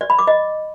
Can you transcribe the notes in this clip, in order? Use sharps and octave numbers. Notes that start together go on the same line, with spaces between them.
D5
B5
D6
D#5